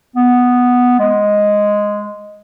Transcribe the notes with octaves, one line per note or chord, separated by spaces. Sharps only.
B3
G#3